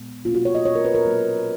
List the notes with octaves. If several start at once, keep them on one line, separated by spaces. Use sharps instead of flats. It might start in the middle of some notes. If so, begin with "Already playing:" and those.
Already playing: A#2 G#3 B3
B2 A#3 C#4 F4
F#4
C#5
D#5
C#5
A#4
B4
A#4
A#2 F#3 A#3